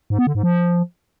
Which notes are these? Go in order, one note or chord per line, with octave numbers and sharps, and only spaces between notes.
G#2
B3
D3
G#2
F3